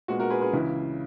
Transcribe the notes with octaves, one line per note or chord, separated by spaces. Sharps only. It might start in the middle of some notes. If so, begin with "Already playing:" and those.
A#2 G#3 B3 F#4
F#4 A#4
G#4 B4
G#4 B4
C#2 C#3 E3 E4